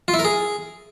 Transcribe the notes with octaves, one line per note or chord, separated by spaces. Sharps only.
F4
E4
A#4
G#4